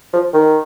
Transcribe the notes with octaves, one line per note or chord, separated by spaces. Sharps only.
F3
D#3